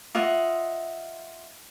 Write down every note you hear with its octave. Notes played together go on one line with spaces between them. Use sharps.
F4 D#5 E5 F#5